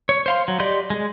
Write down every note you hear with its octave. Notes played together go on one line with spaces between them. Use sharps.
C#5
C5 F5 C6
F#3
G4 D5 D#5 C6 G6
G#3 G#4